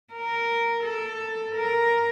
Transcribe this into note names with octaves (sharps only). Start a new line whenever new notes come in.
A#4
A4
A#4